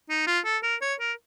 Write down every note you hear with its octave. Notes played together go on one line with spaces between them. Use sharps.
D#4
F4
A4
A#4
C#5
A#4